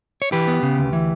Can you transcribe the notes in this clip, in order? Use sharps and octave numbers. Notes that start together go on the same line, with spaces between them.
C#5
E3 G4 B4
B3
C#3
D2
E3